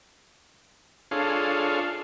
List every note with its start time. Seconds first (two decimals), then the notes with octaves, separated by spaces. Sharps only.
1.11 D4 F4 G#4 A4 C#5 F5